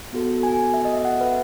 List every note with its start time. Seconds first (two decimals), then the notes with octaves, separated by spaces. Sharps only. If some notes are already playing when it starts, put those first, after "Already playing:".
0.13 B3 F#4 A4
0.43 G#5
0.74 E5
0.85 D#5
0.95 E5
1.05 F#5
1.21 B4